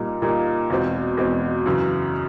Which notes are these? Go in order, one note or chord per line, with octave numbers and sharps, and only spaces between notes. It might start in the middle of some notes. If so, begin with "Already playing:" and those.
Already playing: A#2 G3 A#3 D#4
A#2 G3 A#3 D#4
E2 B2 G#3 C4
E2 B2 G#3 C4
F#2 C#3 E3